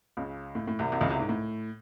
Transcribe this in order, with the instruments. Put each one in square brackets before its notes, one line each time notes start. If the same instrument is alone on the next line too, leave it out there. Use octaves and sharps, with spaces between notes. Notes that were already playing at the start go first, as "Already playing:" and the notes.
[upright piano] C#2 C#3
A2
A2
C2 C3
C2 C3
C#2 C#3
C2 C3
G#2
A2